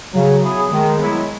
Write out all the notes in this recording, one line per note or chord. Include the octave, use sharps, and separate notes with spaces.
C#3 F#3
F#3 B3 E4 G#4
D#3 G#3
F#3 B3 E4